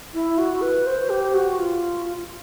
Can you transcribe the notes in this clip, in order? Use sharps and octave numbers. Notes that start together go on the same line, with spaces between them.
E4
F#4
B4
C5
G4
F#4
F4